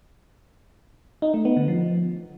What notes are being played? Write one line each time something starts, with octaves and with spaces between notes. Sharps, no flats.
D#4
A3
B3
D3
F3